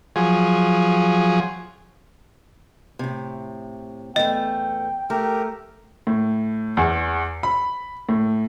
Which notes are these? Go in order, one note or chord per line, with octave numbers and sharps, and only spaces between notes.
F3 F#3 G#4
A2 C3
E2 A3 D#5 G5
A3 G4 A#4
A2
E2
B5
A2